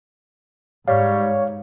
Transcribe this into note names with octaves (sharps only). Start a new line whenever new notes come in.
G#2 G3 C#5 F5